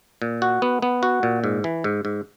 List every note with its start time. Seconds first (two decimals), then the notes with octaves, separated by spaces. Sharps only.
0.22 A#2
0.42 F#4
0.62 B3
0.82 B3
1.03 F#4
1.23 A#2
1.44 G#2
1.64 E3
1.84 G#2
2.05 G#2